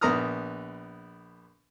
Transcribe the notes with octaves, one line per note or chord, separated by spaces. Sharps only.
A#1 B3 A#5 D#6 F6